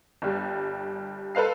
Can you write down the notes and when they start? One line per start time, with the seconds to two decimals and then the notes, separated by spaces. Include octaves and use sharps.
0.22 G1 G3
1.35 A4 B4 C5 F5 C7